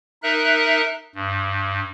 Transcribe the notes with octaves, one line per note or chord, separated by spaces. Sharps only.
D#4 A#4 E5 F#6
G2